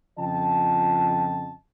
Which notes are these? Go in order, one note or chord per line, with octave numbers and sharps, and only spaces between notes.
F2 C#3 F3 D#5 G5 A5